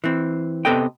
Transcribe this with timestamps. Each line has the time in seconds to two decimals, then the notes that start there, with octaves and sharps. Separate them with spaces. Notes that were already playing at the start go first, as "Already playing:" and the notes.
0.04 E3 C4
0.65 C3 B3 A4 D#5 G5